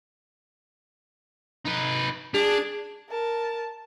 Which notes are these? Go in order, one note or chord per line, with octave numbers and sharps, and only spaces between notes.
D#4 B4
D4 G#4
A#4 A5